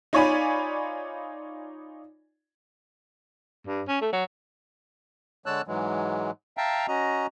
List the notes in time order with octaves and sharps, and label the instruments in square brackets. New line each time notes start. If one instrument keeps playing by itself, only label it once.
[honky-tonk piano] D#4 F4 C#5 D5 G#5 B5
[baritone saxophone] G2
C#4
A3
F#3
[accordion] D3 G#3 C#5 A5 E6 F#6
G#2 E3 F#3 G#3
E5 F5 G5 A5 A#5
C#4 F#4 D#5 A#5